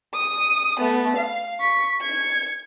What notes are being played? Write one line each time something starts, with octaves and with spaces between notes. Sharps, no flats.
D#6
A3 B3
F5
C#6 B6
G#6 C#7